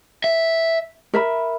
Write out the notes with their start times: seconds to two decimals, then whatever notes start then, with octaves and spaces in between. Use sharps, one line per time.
0.24 E5
1.14 A#4 E5 B5